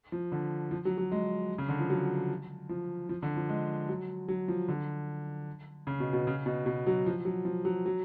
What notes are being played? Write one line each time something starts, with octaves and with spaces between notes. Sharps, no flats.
F3
D3
F3
F#3
F#3
G#3
C#3
D3
F3
F#3
F3
F3
D3
F3
G#3
F#3
F#3
F3
D3
C#3
B2
B2
C#3
B2
B2
F#3
F3
F#3
F3
F#3
F#3